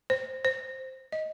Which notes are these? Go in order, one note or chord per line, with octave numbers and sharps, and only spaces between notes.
C5
C5
D#5